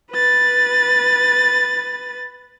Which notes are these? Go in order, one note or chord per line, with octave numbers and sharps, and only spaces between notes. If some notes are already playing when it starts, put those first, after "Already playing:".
B4 A6